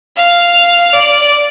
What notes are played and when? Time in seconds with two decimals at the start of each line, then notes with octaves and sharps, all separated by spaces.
0.16 F5
0.93 D5